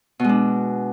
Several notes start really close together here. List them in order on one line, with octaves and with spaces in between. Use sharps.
B2 G#3 D4